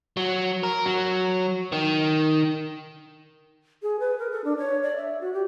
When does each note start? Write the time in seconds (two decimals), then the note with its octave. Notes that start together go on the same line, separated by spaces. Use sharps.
0.17 F#3
0.63 A#4
0.86 F#3
1.72 D#3
3.83 G#4
4.00 B4
4.19 A#4
4.32 A4
4.44 D4
4.58 C#5
4.83 D5
4.96 E5
5.21 F#4
5.34 G4